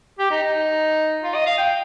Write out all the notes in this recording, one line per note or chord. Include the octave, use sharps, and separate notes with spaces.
G4
D#4
D#4
F4
D#5
F5
G5